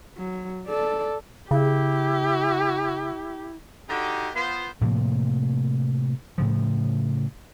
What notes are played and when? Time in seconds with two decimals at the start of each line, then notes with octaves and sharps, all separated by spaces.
0.17 F#3
0.67 A4 D5
1.51 C#3 E4 G4
3.89 D3 D#4 F#4 G4
4.35 B3 F4 C5
4.81 A2 C3 F3 A#3
6.38 A2 C#3 F3